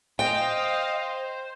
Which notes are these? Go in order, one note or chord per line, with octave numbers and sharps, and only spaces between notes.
C5 D#5 F5 G5